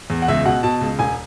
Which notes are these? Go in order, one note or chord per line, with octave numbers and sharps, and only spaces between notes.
E2
F#5
C#2 E5
B2 F#5
B2 A5
C#2
E1 G#5